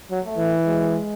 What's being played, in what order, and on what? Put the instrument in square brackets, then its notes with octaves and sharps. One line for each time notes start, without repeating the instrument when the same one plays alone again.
[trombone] F#3
[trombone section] A3
[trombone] E3
[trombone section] G#3